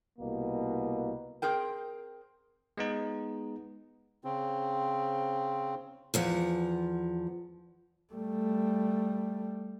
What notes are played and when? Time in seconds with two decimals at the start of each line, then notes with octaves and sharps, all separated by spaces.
0.18 C2 B2 A#3
1.42 C4 G#4 A#4 G5
2.77 G#3 B3 D#4
4.24 C#3 C4
6.14 E2 F3 F#5
8.14 G3 A3